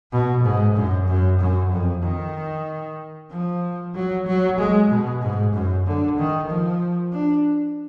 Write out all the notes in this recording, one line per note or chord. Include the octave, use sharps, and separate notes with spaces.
B2
G#2
F#2
F#2
F#2
F2
D#3
F3
F#3
F#3
G#3
B2
G#2
F#2
D3
D#3
F3
D4